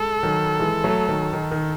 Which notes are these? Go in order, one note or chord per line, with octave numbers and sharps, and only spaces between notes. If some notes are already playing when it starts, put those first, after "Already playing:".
Already playing: G#3 A4
D#3 F#3
E3 G#3
F#3 A3
D#3 F#3
D#3
D#3